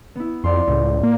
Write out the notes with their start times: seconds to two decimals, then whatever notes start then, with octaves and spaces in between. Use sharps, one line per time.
0.16 B3 E4
0.44 F2 D5 F5 C6
0.68 C#2 A2
1.03 A#3